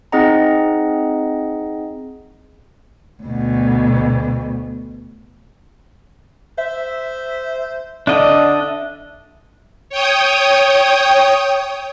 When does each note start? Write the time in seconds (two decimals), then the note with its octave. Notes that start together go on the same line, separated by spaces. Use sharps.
0.12 C4 D#4 G#4 D#5 F#5 A#5
3.23 D2 B2
6.58 C5 E5
8.07 D3 D4 D#5 E5
9.90 C#5 G5 D#6